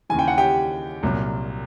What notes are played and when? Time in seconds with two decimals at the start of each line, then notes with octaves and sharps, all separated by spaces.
0.10 D#2 C#3 E3 G#5
0.19 G5
0.28 F#5
0.38 G4 G5
1.03 C2 A#2 F#3